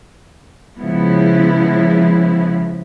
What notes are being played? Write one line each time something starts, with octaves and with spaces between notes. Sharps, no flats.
C#3 F3 G#3 B3 E4